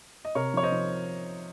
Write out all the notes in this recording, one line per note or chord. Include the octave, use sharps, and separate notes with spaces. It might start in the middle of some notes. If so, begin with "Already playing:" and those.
D#5
C3 A#4 C#5
F3 C#5
C5 D#5
F3